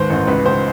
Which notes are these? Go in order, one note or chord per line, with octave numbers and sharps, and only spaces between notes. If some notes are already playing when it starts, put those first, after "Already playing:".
Already playing: D#2 G#2 D#3 B4 C5
A1
C#2 B4
C#2 C5